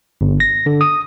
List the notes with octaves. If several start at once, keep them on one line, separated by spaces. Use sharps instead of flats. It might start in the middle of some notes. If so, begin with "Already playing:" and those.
G1
A#6
D3
D#6